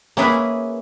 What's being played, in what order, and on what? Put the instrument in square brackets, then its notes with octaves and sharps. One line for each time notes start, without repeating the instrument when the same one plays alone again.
[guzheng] A#3 C#4 E4 G#4 B4